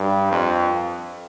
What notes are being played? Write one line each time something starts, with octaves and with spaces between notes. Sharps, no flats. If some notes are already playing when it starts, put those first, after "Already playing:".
Already playing: G2
F2